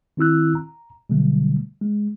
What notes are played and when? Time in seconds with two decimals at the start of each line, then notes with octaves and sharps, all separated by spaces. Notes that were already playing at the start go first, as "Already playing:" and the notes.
0.17 D#3 C4 E4 E6 F#6
0.55 A#5
1.10 B2 D3 F#3 G3 A3
1.81 G#3